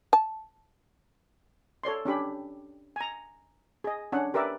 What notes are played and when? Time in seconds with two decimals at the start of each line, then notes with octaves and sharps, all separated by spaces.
0.13 A5
1.83 A4 C#5 D5 C6
2.05 C#4 D4 G4 B5
2.96 G#5 A#5
3.84 G#4 D#5
4.12 C#4 D4 F#5
4.34 G4 A#4 B4 D5 E5